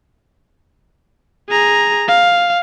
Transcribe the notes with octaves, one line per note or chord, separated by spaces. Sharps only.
G#4 A#5
F5